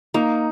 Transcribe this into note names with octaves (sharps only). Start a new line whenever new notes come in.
A#3 D#4